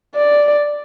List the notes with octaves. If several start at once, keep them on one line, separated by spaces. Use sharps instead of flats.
D5